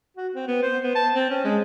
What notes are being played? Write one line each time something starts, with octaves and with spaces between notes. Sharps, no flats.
F#4
C4
B3
C5
B3
A5
C4
C#4
G#3